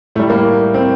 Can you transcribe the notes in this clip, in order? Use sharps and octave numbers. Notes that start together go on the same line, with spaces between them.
A2 G3 A3
A#3
C4